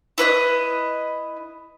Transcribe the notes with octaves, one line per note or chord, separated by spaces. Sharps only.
E4 B4 C#5 D#5